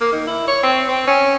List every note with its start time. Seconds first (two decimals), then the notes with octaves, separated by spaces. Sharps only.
0.01 A#3
0.12 D#3
0.27 E4
0.47 C#5
0.63 C4
0.88 C4
1.07 C#4